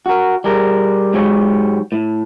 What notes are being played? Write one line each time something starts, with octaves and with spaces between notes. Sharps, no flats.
F#4 A#4
G3 G#4 A#4
G#2 F#3 G#3 G4 C#5
A2